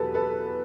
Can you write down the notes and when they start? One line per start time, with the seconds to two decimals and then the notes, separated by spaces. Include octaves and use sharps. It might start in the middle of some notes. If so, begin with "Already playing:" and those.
Already playing: E2 B2 F#3 G4 A4 B4
0.14 A4 B4